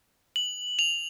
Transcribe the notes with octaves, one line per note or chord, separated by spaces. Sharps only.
F#7
F7